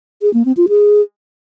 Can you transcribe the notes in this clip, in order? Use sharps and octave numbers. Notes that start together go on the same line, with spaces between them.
G#4
A#3
C4
F4
G#4